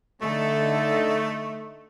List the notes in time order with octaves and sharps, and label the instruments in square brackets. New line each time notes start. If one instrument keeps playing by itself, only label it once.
[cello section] D3 D#4 A4 [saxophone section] A3